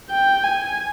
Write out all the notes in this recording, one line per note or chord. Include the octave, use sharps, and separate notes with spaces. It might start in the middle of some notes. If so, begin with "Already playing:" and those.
G5
G#5